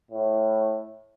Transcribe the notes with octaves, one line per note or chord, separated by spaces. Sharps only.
A2